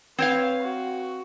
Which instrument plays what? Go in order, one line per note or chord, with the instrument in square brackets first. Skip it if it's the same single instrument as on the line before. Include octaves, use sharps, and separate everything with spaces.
[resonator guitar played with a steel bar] C4 C#5 F5 [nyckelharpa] B4
[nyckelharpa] F#4